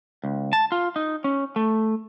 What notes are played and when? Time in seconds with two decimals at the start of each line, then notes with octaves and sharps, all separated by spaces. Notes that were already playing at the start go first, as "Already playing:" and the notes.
0.24 C#2
0.53 A5
0.72 F4
0.96 D#4
1.24 C#4
1.56 A3